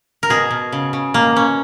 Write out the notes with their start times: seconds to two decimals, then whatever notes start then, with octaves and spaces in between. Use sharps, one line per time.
0.23 A#4
0.30 B2 G#4
0.51 B2
0.72 C#3
0.93 C#3
1.14 B2 A#3
1.36 B2 C#4